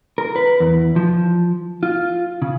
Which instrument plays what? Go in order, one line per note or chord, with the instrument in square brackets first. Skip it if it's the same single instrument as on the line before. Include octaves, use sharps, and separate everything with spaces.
[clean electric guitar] A#4
B4
E2
F3
F4
C#3